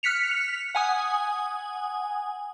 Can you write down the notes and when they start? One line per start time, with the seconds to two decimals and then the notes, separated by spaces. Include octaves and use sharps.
0.03 F6 F#6 B6 C#7 F7
0.75 F#5 G#5 D#6